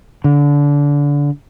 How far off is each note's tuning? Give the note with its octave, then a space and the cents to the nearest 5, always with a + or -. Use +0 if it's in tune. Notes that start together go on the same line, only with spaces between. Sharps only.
D3 -25